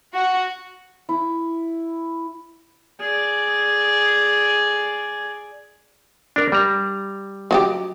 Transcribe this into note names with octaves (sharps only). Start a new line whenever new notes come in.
F#4
E4
G#4 D5
D4 A#4
G3 A#5
F#3 F#4 G4